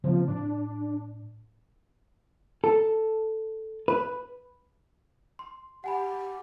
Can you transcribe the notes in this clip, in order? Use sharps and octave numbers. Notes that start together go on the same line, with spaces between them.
C#3 F3 A#3 C4
A2 D4
A4
B4
C6
G4 F#5 G#5 B5